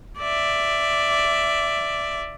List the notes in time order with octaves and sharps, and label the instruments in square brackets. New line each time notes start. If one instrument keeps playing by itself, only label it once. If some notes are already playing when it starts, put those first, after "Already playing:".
[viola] D5 E5